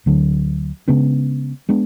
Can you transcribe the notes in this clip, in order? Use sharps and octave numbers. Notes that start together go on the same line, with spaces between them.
D2 D3 F#3
C#3 G#3 B3 D4
G#3 B3 D4